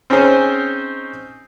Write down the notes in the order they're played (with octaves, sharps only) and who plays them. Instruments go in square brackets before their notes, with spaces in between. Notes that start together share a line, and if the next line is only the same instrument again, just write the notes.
[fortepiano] C4 C#4 D#4 G#4 C5